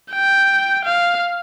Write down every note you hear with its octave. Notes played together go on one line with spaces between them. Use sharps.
G5
F5